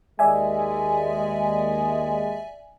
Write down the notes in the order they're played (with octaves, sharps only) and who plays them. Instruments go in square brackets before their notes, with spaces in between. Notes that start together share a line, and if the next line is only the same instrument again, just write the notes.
[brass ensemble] D#2 G#3 [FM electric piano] D5 E5 G#5